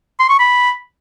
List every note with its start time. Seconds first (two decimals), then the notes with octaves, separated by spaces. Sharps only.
0.19 C6
0.29 C#6
0.39 B5